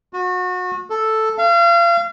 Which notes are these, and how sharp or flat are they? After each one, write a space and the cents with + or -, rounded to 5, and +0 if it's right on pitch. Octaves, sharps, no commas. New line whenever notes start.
F#4 -30
A4 +0
F5 -35